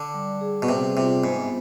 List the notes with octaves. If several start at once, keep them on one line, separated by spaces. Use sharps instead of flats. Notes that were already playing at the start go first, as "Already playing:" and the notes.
Already playing: D3 D5
G3
G#4
B2
C3 C4
C3 F4
G#2 B3